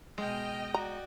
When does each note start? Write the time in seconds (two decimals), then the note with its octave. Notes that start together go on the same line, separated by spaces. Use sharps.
0.18 B2 G#3 D#5 G5 F6
0.74 F#4 D5 A#5